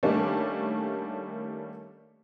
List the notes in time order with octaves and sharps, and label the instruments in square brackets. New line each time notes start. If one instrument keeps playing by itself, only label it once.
[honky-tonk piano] D#3 G3 A3 A#3 C#4 D4